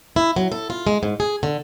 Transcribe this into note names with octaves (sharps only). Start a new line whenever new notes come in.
E4
F#3
A4
F4
G#3
G#2
G#4
D3